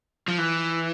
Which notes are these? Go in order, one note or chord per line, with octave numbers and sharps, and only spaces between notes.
F3
E3